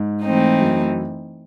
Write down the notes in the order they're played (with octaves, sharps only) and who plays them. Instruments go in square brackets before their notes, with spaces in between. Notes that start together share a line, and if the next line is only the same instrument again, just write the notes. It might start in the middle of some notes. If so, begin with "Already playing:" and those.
Already playing: [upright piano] G#2
[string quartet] E3 A3 C4 D#4
[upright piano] F#2